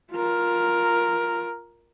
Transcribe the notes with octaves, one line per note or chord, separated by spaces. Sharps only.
F4 A#4